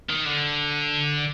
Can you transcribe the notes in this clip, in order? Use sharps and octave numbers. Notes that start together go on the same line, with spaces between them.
D#3
D3